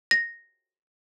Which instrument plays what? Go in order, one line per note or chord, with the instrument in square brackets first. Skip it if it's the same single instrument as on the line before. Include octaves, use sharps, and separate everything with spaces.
[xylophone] A#6